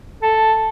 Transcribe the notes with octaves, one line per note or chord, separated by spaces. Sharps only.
A4